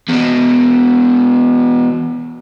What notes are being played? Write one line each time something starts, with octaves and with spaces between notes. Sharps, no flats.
E2 B2